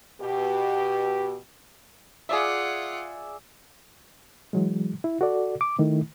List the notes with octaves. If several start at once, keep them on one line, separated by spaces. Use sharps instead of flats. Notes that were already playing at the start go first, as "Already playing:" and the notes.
B2 G4
F4 G#4 D5 E5 F#5
E3 F#3 G#3
E4
F#4 A4 D5
D6
D#3 A3 E4